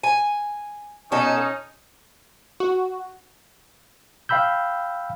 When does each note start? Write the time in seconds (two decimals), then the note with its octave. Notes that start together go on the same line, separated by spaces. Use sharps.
0.03 G#5
1.12 B2 C#4 D#4 A4
2.60 F#4
4.29 F5 G5 B5 E6 G6